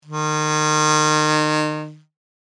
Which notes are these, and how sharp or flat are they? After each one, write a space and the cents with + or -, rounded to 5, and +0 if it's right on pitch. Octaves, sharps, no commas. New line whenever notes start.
D#3 -30